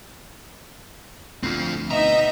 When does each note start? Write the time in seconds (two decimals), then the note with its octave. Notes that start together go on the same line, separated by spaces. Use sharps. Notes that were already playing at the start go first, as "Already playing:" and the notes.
1.43 D2 C4 F4
1.91 B2 D#4 D#5 E5 A#5